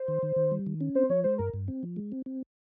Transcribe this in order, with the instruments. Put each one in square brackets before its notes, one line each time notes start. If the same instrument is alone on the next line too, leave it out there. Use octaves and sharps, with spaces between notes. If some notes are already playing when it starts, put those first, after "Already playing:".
Already playing: [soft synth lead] C5
[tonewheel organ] D#3
D#3
D#3
G3
D#3
C#4
[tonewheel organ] C4 [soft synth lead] C5
[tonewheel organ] F3 [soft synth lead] C#5
[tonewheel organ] G#3 [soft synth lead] C5
[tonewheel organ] G2 [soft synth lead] A#4
[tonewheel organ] G2
C4
F3
G#3
C4
C4